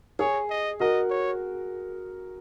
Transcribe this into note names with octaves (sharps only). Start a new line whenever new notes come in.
G#4 C#5
D#5
F#4 A#4 D#5
C#5